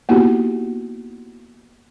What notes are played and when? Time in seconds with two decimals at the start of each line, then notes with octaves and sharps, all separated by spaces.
0.09 A#3 B3 D#4 E4 F#4 G4